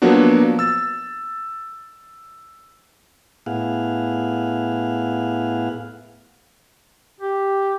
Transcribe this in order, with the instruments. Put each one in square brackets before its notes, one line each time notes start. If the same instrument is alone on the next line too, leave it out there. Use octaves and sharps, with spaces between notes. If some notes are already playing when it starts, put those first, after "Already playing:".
[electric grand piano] F3 F#3 A#3 B3 D4 F#4
E6 A6
[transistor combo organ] A2 B3 E4 G#4 F5 F#5
[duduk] G4